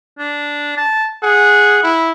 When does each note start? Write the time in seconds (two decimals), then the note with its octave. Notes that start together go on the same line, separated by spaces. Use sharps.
0.19 D4
0.77 A5
1.23 G#4 F#5
1.83 E4